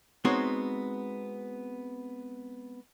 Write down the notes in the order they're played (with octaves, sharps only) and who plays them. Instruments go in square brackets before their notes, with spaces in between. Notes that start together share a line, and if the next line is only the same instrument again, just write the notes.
[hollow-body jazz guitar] G#3 B3 C4 D#4 F#4 C#5